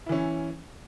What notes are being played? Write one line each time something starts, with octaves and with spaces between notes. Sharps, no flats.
E3 C#4 E4